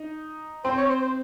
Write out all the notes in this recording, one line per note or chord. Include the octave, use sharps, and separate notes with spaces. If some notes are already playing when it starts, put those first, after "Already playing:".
Already playing: D#4
C4 C5
C#5
C5
C5